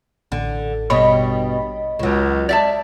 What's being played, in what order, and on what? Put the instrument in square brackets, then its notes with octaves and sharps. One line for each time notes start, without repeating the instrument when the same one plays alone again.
[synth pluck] A1 [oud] D3
[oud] G2 B2 G3 [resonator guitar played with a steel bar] C#5 [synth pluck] D#5 B5
[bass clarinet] C#2 [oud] C#3 F#3
[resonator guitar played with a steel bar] D5 E5 A5